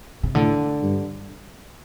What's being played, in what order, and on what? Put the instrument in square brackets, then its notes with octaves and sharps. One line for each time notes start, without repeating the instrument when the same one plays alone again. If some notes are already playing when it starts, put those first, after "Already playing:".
[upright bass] C3
[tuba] A2 [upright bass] D3
[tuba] G2